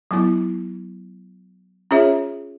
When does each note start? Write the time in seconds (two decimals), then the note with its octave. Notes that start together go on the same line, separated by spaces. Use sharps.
0.11 F#3 B3 E4
1.91 C#4 F4 G#4 C#5 E5